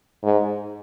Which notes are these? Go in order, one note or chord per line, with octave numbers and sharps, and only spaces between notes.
G#2